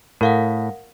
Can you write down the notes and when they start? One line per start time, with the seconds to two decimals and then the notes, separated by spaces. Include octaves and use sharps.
0.21 A2 A#4 F5 F#5